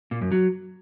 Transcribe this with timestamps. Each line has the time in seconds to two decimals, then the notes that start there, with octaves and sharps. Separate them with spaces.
0.11 A#2
0.21 F#2
0.32 F#3